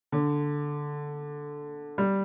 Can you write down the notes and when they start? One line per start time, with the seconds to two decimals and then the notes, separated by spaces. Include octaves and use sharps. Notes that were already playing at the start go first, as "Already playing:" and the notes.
0.12 D3
1.98 G3